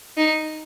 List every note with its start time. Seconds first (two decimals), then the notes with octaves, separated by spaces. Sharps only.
0.17 D#4